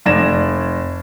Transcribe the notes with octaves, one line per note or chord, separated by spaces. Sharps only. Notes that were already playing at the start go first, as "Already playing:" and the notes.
F1 D5 G#6 A#6 E7